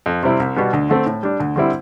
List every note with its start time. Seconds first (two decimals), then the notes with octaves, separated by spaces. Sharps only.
0.06 F2
0.23 C3 G3 C4 E4
0.40 C2
0.56 B2 G3 B3
0.73 D2
0.89 D3 A3 C4
1.06 A2
1.23 G3 D4
1.40 D2
1.56 D3 G3 C4 E4